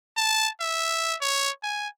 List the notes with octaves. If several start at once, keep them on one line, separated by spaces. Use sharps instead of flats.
A5
E5
C#5
G#5